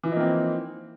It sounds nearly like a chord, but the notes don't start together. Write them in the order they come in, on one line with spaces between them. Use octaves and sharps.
E3 F3 D#4 A#3 C4